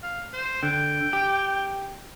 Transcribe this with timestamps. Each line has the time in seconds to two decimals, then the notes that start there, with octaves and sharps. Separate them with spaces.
0.03 F5
0.34 C5
0.63 D3 G5
1.13 G4